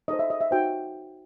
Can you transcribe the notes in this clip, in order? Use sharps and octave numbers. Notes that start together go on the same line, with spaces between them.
D#4 A4 C5 D#5
E5
D#5
E5
D#4 F#4 C5 G5